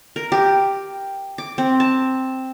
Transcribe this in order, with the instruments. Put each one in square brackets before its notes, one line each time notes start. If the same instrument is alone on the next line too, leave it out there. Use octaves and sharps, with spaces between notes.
[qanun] A#4
G4
D6
C4
A5